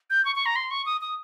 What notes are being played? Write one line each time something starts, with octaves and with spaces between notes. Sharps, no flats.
G6
C#6
C#6
A#5
C6
C#6
D#6
D#6